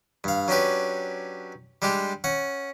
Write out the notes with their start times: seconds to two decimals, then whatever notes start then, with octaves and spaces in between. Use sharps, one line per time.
0.24 G2 F5
0.48 F#3 C#4 D4 G4 B4
1.82 G3 G#3 D4 G4
2.24 C#4 F#5